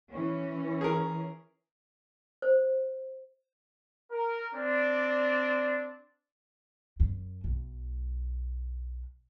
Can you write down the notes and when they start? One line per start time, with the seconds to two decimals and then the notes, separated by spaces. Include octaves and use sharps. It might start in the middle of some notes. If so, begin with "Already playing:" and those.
0.13 E3 C#4
0.81 G#4 A#4
2.42 C5
4.12 A#4
4.55 C4 D4 D5
7.00 F#2
7.44 B1